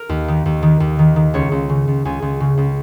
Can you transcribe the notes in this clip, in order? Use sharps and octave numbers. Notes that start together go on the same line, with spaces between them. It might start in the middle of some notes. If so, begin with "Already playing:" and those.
Already playing: A#4
D#2
D#3
D#2
D#3
D#2
D#3
D#3
C#2 C#5
C#2
C#3
C#2
C#2 G#5
C#2
C#3
C#2